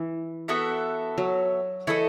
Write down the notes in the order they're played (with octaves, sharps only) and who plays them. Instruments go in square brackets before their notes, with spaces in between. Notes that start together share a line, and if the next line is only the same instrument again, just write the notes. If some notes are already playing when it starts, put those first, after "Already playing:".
Already playing: [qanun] E3
[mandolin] B3 F#4 A4 E5
[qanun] F#3
[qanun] E3 [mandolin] A3 E4 A4 D#5